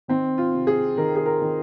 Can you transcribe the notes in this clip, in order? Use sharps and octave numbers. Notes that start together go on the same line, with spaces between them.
D#3 C4
F4
C3
G#4
D#3 A#4
G#4
A#4
D#3